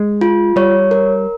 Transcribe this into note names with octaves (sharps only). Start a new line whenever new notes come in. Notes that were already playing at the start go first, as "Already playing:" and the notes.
Already playing: G#3
F4
G3 C#5
A#4